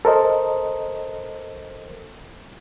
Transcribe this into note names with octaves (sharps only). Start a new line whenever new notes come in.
A4 A#4 C5 D#5